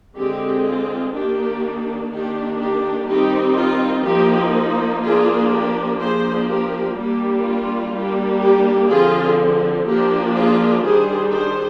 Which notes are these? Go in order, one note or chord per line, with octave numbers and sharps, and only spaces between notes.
D3 G#3 C4 G4
F4
D#3 A#3 D4 G4
D#3 A#3 D4 G4
G4
D#3 G3 C4 D#4 G4
F4
F3 A#3 D#4 G4
F3 A#3 D4 F4 G#4
G4
F3 A#3 D4 G#4 C5
G4 A#4
G3 A#3 D4 G4
F4
G3 A#3 D4
G4
D3 F3 C4 F4 G#4
F3 A#3 D4 G4
F4 G#4
D#3 G3 D4 G#4 C5
G#4 C5